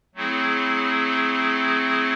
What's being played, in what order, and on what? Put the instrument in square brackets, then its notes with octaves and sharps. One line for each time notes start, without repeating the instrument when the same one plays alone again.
[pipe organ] F#3 A3 C4 E4 G#4